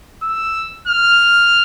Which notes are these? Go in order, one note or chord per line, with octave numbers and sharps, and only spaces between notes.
E6
F6